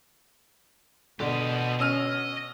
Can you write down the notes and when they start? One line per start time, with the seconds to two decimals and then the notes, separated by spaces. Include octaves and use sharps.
1.20 B2 D3 G4 D#5
1.80 C#4 D#5 E6 F6